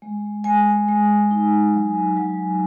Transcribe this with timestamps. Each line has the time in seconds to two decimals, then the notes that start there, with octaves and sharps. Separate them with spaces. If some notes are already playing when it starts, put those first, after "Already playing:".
0.02 G#3
0.44 G#3 G#5
0.88 G#3
1.31 D#4
1.74 F#3
2.17 F#3